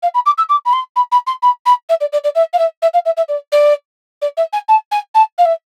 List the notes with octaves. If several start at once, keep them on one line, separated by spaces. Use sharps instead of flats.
F5
B5
D6
E6
D6
B5
C6
B5
B5
C6
B5
B5
E5
D5
D5
D5
E5
F5
E5
E5
F5
E5
E5
D5
D5
D5
E5
G#5
A5
G#5
A5
F5
E5